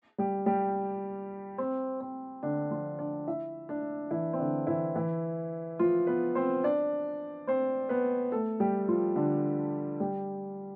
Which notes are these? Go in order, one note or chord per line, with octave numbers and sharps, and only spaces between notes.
G3 G4
G3 G4
C4
C4
D3 D4
F3 F4
D4 D5
E4 E5
D4 D5
E3 E4
C4
D3 D4
E3 E4
E3 E4
F3 F4
B3 B4
C4 C5
D4 D5
C4 C5
B3 B4
A3 A4
G3 G4
F3 F4
D3 D4
G3 G4